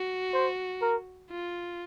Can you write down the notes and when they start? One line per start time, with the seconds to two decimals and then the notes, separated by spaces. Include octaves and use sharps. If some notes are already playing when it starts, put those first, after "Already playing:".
Already playing: F#4
0.33 C5
0.82 A#4
1.30 F4